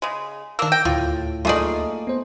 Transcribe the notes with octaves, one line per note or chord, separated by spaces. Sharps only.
C#3 G#3
D#3 A#3 D4 E6
G5 A#6
D2 A2 F4
A3 A#3 D#4 F4 G#4 D5
B3 C5